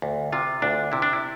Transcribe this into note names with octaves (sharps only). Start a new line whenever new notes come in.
D2
C3 F4
D2 D4
C3 E4
D4
E4